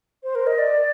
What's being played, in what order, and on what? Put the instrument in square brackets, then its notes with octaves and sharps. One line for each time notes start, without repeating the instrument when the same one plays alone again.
[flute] C5
A#4
D#5
D5